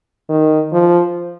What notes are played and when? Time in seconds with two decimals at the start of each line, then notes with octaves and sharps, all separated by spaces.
0.30 D#3
0.73 F3